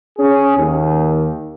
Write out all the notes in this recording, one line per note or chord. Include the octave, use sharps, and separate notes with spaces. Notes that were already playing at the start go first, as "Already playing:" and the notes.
C#4 G#4
D#2